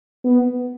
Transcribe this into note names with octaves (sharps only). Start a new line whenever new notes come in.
B3